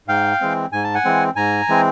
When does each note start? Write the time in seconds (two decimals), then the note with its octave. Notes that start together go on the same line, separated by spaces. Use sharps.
0.08 G#2 F5 G5
0.41 E3 G#3 C4
0.72 G#2 G#5
0.84 A5
0.94 F#5 G#5
1.05 E3 G#3 C4
1.36 G#2 G#5 A#5
1.69 E3 G#3 C4